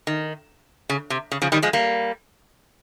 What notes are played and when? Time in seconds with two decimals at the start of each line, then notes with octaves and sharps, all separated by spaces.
0.07 D#3
0.89 C#3
1.10 C3
1.32 C#3
1.42 C#3 F3
1.52 D#3 G3
1.63 F3 G#3
1.73 G3 A#3